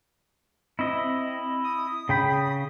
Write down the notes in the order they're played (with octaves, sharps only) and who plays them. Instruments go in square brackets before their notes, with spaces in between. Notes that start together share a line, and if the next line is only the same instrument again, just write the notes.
[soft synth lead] C4 [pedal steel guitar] E4 D#5
[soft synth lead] D#6
[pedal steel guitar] C#3 G5 B5